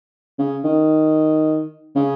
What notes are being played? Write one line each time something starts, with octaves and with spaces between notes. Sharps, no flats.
C#3
D#3
C#3